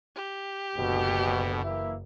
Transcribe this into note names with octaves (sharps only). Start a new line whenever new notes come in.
G4
F#1 D2 B2
E3 A#3 E4